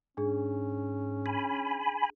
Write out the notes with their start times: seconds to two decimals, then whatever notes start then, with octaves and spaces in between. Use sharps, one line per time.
0.17 G#2 C#4 D4 G#4
1.26 G#5 B5